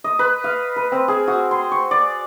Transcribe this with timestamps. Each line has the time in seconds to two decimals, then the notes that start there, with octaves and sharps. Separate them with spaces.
0.04 D#5
0.19 B4
0.44 F5
0.76 B4
0.92 C4
1.08 G#4
1.28 F#4
1.51 C6
1.72 C#6
1.91 D5